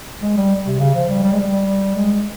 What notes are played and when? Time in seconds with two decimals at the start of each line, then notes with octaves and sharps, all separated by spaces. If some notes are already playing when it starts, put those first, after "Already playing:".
0.22 G#3
0.37 G3
0.66 C3
0.80 C#3
0.94 F3
1.09 G3
1.23 G3
1.32 G#3
1.40 G3
1.95 G#3